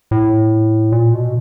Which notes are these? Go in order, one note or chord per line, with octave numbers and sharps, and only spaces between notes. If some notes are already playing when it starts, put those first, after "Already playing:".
A2
A#2
B2